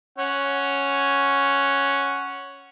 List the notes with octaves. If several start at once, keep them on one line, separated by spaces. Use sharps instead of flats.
C#4 F#5